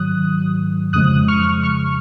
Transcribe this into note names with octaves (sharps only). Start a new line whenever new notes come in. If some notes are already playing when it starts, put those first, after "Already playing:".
Already playing: G#2 D#3 F#3 D#6 F#6
F2 C#3 F3 G#3 D#6 F#6
C#6 F6
C#6 F6